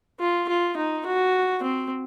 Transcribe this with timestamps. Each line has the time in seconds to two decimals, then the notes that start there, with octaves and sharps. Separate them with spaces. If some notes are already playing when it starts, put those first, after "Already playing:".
0.20 F4
0.49 F4
0.77 D#4
1.06 F#4
1.63 C4